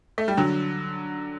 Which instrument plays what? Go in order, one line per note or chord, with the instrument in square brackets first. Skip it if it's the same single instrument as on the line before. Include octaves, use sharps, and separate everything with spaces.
[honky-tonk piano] A3
G3
D3 F#3